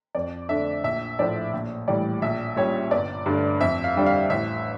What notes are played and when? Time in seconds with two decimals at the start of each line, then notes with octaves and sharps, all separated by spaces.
0.15 F2 D5
0.49 D3 A3 D4 E5
0.84 A#1 E5
1.19 A2 F3 A3 D5
1.53 A#1
1.88 A2 E3 G3 D5
2.22 A#1 E5
2.56 A#2 G3 C#4 C#5
2.91 G1 D5
3.26 G2 D3 A3
3.60 F2 E5
3.84 F5
3.95 D3 G3 D4
4.06 F5
4.30 A1 E5